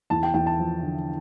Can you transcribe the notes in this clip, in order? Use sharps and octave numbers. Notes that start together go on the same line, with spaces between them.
E2 A5
G5
E2 G5
A5
F3
D3